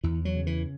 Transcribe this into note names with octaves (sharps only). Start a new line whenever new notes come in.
E2 E3
F#3
C#3
E3